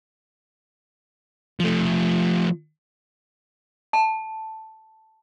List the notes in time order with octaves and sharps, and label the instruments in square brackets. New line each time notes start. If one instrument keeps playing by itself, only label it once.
[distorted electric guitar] F3 A3
[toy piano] A5